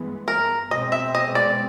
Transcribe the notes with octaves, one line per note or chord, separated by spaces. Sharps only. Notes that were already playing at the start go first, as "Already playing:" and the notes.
Already playing: G2 E3 G#3 B3
A#4
B2 G#3 C4 D#5
E5
D#5
D5